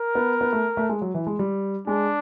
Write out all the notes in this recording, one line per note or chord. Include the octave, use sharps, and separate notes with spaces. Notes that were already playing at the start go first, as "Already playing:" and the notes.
Already playing: A#4
B3
B3
A3
A3
G#3
F#3
E3
G#3
G3
G#3 D4